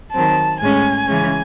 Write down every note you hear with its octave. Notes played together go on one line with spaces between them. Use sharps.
D#3 F#3 C4 A5
A2 G#3 C#4 G#5
C#3 E3 G#3 C#4